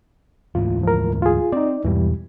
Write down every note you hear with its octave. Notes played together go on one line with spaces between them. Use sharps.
D2 G#2 E3 F4
F3 A#4
F4 G#4
C4 D#4 D5
E2 G#2 B2 E3 G3